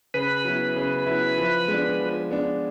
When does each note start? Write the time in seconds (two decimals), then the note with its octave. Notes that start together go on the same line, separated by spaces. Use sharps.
0.14 C#3 B4
0.45 F#3 B3 E4
0.76 C#3
1.06 F#3 B3 E4
1.38 F3
1.68 G#3 B3 D4
2.00 F3
2.31 G#3 B3 D4